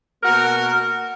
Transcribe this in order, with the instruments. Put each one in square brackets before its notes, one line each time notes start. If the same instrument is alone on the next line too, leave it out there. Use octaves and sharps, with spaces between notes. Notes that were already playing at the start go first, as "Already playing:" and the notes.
[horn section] B2 A#3 F#4 A#4